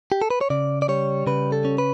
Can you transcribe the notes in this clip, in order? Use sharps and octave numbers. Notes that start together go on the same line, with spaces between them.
G4
A4
B4
C#5
C#3 D5
D5
G3 C#5
C#3 B4
A4
C#4
B4